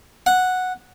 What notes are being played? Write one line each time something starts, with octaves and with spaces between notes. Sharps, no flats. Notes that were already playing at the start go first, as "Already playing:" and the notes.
F#5